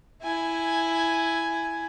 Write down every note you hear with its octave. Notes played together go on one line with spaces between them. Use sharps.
E4 G#5